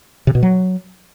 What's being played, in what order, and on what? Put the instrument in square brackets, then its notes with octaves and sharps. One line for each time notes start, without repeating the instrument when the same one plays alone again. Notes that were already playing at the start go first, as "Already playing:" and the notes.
[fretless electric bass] C3
B2
F#3